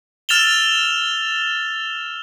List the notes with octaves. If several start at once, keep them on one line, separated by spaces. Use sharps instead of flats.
E6 F6 A6 E7 F7 G7